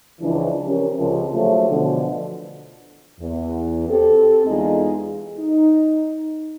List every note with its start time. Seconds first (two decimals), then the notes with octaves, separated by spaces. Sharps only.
0.20 C#2 E3 F3 D4
0.67 C4 C#4 G4 A#4
0.96 C#2 C3 F3
1.33 D#2 C#3 F3 F#3 A3
1.69 B2 D3 E3 F3
3.20 E2
3.89 C4 G4 A4
4.47 E2 G#3 D#4 F4 G#4 D#5
5.38 D#4